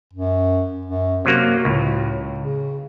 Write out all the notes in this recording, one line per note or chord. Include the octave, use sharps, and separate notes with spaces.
F#2
F#2
C3 F#3 A#3 F#4
C#2 A2
C#3